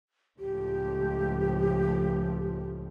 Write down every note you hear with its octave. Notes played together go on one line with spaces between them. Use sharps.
C#2 A2 F3 G4